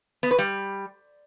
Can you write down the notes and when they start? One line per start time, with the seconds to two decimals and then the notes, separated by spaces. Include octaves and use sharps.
0.23 B3
0.31 B4
0.39 G3